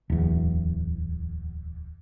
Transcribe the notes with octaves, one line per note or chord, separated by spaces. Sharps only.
D1 E2